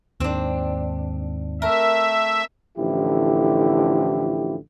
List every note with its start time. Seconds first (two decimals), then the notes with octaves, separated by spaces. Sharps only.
0.20 D#2 G#2 C4 D4
1.62 A3 A#4 E5
2.78 A1 D3 F3 E4 G4